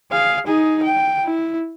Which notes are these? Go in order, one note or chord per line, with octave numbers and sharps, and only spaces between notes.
G#4 F5
D#4 G#4
G5
E4